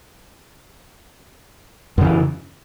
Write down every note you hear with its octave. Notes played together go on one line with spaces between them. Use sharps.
F#2 C#3 E3